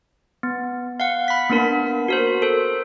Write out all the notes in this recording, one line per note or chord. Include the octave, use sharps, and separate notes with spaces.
B3
F5 F#5
B5 B6
A#3 B3 D4 A#4
F#4 A#4 C5
A4 C5